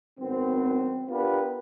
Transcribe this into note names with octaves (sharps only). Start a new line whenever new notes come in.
G#1 F#2 B3 C4
B3 D4 F4 G4 A#4 B4